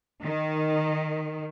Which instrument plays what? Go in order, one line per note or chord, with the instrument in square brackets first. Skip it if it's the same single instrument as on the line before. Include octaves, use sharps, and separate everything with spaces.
[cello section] D#3